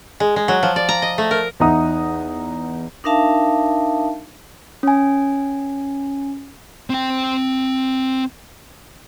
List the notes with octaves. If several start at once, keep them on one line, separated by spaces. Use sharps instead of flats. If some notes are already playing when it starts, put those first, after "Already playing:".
G#3
G#3
F#3
F3
D5
A#5
D#5
A3
A#4
E2 D#4 E5 F#5 A#5 D#6
D4 D#4 A#4 E5 F5 A5
C#4 G#5
C4 G5